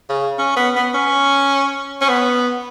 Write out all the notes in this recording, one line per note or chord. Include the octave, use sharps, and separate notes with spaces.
C#3
C#4
B3
B3
C#4
C#4
B3